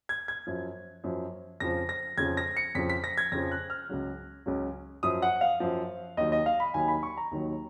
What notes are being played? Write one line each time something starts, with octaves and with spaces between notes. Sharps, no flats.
G#6
G#6
F#2 F3
F#2 F3
F2 C#3 F3 A#6
A#6
F2 C#3 F3 G#6
A#6
C#7
F2 C#3 F3 B6
B6
A#6
G#6
F2 C#3 F3 A#6
F#6
F6
C#2 C#3 F#3
C#2 C#3 F#3
F#2 F3 D#6
F#5
F5
F#2 F3
D#2 D#3 F#3 D#5
D#5
F5
B5
D#2 D#3 F#3 G#5
B5
C#6
A#5
D#2 D#3 F#3